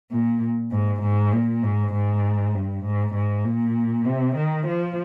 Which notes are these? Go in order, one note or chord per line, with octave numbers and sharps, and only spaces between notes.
A#2
G#2
G#2
A#2
G#2
G#2
G2
G#2
G#2
A#2
C3
D#3
F3